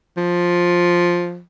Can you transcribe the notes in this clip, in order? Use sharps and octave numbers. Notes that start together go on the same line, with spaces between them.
F3